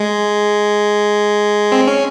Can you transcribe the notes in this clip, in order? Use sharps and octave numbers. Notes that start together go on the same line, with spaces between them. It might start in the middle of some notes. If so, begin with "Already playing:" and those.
Already playing: G#3
C4
C#4